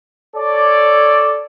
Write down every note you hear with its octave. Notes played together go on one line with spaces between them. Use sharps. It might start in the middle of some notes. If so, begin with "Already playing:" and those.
A4 C#5 D5